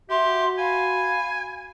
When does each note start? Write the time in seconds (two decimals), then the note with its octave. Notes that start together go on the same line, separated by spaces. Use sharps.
0.10 F#4 G4 E5 C6
0.58 F5 G#5 B5